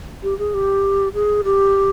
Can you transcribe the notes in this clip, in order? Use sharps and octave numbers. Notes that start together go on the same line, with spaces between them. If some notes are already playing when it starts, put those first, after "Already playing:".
G4
G#4
G4
G#4
G4